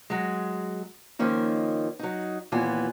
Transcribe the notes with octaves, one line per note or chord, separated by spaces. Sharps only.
F#3 G#3
D#3 F3 A#3 C#4 D#4
F#3 D#4
D#2 A#2 E3 B3 F4 G#5